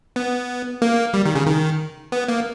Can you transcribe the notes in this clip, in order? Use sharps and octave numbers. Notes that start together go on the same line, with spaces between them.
B3
A#3
G3
D#3
C#3
D#3
B3
A#3